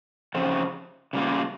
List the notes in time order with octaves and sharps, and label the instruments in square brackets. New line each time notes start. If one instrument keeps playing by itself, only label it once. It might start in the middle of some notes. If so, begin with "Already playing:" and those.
[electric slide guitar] F2 C#3 F3 C4
C#3 G3 A#3 F4